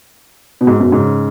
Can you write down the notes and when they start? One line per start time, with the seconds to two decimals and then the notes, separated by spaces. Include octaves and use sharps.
0.61 B2
0.67 G#2
0.79 F#2 B2
0.92 G#2 C#3